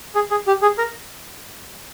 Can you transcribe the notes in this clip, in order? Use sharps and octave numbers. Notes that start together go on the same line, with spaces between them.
G#4
G#4
G4
G#4
A#4